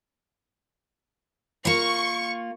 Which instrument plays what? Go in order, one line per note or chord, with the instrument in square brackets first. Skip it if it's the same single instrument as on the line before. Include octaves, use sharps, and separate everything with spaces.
[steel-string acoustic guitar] A#3 F4 [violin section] C#6